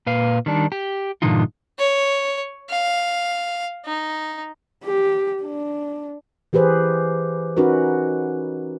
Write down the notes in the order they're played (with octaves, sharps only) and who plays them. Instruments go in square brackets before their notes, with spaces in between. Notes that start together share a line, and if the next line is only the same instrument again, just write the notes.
[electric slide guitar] A#2 B4 F5
D#3 G3 D4
G4
G2 A#2 D3 E3 D#4 F4
[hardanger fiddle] C#5
F5
D#4
[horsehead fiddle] G4
D4
[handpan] E3 G4 G#4 B4 C5
C#4 D#4 F#4 A#4 B4